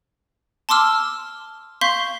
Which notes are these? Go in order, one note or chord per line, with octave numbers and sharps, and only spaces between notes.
A5 C6 D6 E6 F6
F5 C6 C#6 G6 B6